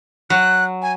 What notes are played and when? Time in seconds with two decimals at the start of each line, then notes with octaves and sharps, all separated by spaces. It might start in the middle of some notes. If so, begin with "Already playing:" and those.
0.30 F#3 F#6
0.82 G#5